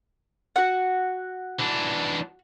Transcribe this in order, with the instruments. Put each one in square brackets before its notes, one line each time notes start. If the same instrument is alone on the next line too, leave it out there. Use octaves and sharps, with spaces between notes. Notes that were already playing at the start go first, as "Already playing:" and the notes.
[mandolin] F#4 F#5
[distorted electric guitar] E3 D4